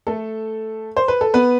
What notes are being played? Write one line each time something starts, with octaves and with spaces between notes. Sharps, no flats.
A3 A4
C5
B4
A4
B3 B4